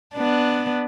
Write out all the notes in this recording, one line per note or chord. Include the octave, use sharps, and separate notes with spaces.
B3 D4